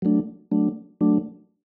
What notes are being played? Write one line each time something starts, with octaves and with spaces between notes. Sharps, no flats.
F#3 A3 D4
F#3 A3 D4
F#3 A3 D4